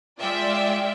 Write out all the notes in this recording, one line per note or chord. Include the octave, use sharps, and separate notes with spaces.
G#3 F4 G#4 D5 E5 G5